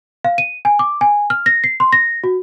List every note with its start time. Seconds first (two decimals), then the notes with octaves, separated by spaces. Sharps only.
0.24 F5
0.38 D#7
0.65 G#5
0.79 D6
1.01 G#5
1.30 F6
1.46 A#6
1.64 C7
1.80 C6
1.93 A#6
2.24 F#4